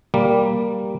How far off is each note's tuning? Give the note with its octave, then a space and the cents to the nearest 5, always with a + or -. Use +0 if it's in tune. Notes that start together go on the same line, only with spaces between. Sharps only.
G3 +0 A#3 +0